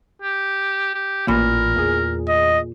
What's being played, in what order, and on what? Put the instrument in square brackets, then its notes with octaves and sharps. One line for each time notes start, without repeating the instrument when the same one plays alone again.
[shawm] G4
G4
[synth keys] A1 B5 [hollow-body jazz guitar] A#2 [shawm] A#4
[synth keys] E2 G#4
[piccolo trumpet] D#5